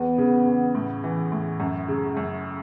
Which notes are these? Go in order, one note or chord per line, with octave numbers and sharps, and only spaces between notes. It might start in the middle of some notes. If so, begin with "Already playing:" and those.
Already playing: E2 B3
C#3
E2
A2
E3
A2
F#2
C#3
F#2